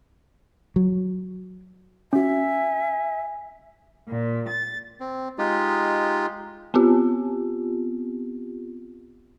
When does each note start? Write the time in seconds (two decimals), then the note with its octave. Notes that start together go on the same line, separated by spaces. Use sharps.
0.76 F#3
2.13 C#4 F#4 E5 G#5
4.08 A#2
4.49 A6
5.00 C4
5.38 G#3 D#4 F4 G4
6.74 B3 C4 F4 G4